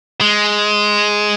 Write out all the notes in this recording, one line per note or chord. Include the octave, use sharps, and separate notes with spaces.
G#3